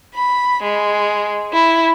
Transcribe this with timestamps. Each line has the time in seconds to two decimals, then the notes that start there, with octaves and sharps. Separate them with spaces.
0.14 B5
0.63 G#3
1.52 E4